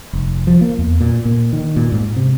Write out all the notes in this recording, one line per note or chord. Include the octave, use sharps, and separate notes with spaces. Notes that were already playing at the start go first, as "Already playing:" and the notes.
F1
F3
A#3
E2
A#2
A#2
D#3
A#2
G#2
C3